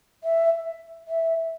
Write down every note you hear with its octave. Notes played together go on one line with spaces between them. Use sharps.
E5
E5